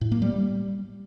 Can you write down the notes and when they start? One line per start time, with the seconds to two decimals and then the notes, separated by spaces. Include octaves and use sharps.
0.01 A2
0.12 A#3
0.22 G3